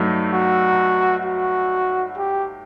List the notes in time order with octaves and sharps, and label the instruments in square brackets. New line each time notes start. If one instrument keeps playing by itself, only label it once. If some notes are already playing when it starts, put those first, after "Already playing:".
Already playing: [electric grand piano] G2 F#3 A3 D#4
[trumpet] F#4
F#4
G4